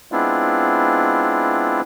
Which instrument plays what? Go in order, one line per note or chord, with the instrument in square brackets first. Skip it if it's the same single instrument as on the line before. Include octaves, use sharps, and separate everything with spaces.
[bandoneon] G#3 B3 C4 D4 E4 F4